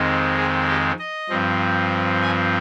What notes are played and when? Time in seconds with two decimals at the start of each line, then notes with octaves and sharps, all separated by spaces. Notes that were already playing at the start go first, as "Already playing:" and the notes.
Already playing: F2 D#3 G#3 C4
0.36 G#4
0.67 G4
0.99 D#5
1.29 G2 F3 C4
2.22 G#5